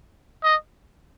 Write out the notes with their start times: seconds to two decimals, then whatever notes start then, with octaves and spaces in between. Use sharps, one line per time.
0.43 D#5